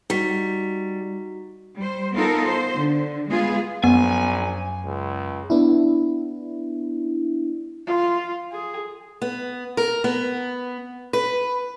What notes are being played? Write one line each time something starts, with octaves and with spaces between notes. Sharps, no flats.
G3 D#4 F#4 B6
G3 C5
B3 D#4 F4 A4 A#4
C5
D3
G#3 B3 F4 G#4
A#1 F#2 B3 G#5
C#2
B3 D4 E4
F4
G#4
B3
A#4
B3
B4